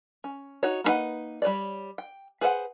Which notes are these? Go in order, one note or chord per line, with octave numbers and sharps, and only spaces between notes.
C#4
D#4 F#4 C#5
A#3 C4 D#4 B4 F#5
G3 B4 C#5 D5
G5
G#4 B4 C5 F5 F#5